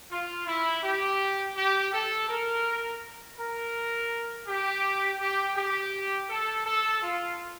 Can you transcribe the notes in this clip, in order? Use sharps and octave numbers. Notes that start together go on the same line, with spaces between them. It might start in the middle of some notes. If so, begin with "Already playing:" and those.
F4
E4
G4
G4
A4
A#4
A#4
G4
G4
G4
A4
A4
F4